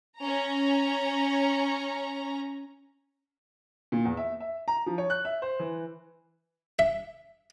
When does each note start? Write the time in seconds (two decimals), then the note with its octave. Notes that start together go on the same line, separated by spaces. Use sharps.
0.18 C#4 A#5
3.92 A#2
4.05 E2
4.17 E5
4.40 E5
4.68 A#5
4.86 F3
4.98 C#5
5.10 F#6
5.25 E5
5.42 C5
5.59 E3
6.79 E5